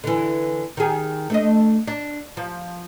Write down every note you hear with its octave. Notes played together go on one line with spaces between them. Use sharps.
D3 E3
D#3 G#4
A3 D4 D#5
D4
F3